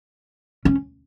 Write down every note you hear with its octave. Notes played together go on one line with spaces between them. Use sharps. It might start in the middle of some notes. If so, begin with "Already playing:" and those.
C#4